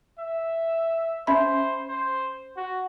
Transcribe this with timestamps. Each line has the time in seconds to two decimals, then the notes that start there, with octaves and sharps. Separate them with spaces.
0.19 E5
1.27 C#4 C5 E5 B5
1.89 C5
2.57 F#4